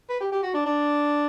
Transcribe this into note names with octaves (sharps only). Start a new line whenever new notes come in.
B4
G4
G4
F#4
D4
D4